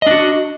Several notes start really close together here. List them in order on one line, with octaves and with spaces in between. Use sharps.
D#5 D4 F#4